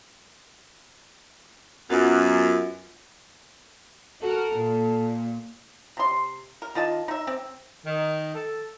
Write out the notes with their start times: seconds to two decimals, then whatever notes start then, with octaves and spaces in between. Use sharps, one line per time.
1.90 F#2 B3 F4 F#4
4.23 F#4 A4 A#4
4.55 A#2
5.97 C3 C6
6.62 A#4
6.75 D#3 F4 D#5 A5
7.08 D#4 E5
7.27 C4
7.86 D#3
8.35 A4